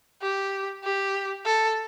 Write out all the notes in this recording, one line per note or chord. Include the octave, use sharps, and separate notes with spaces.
G4
G4
A4